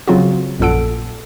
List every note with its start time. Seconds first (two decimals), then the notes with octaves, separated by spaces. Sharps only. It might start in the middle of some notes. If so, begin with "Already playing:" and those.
0.07 C#3 F#3 C4 F4 F#4
0.59 A#1 F#2 A#2 A4 F#5 D7